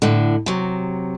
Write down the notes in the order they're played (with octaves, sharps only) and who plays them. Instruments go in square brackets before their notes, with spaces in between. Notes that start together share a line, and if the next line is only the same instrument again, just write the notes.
[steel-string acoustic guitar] A2 D3
C3 F#3